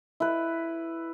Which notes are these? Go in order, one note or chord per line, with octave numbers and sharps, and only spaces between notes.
E4 B4